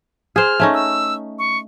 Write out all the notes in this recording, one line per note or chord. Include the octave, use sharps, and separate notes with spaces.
G#4 C5 F6
A3 C#4 D#4
E6
C#6